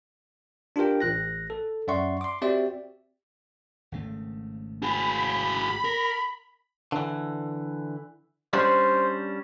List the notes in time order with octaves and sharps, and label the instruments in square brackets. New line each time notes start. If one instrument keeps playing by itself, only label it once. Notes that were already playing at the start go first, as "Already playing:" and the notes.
[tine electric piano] D4 F4 G4 A#4 G5
A1 F#6 A#6
A4
F#2 D5 E5 F#5 C6 C#6
C6 D6
C4 F#4 G4 D5 E5
[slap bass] G#1 C#3 A3
[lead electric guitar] F#4 G#4 [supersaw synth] B5
[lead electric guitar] A#4
[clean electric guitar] D3 E3
[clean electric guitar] G3 C#4 D4 [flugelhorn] C5